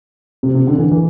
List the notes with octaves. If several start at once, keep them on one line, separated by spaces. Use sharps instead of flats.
C3
C3
D3
E3
E3